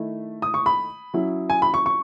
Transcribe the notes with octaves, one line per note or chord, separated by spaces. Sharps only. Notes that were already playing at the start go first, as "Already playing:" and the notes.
Already playing: D#3 A3 E4
D#6
C#6
B5
F#3 C#4 E4
G#5
B5
C#6
C#6